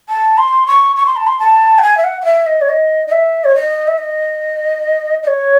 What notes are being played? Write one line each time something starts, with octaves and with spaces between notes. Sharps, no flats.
A5
C6
C#6
C#6
C6
A5
C6
A5
F#5
G#5
E5
F#5
F#5
E5
D#5
C#5
D#5
D#5
E5
C#5
D#5
E5
D#5
D#5
C#5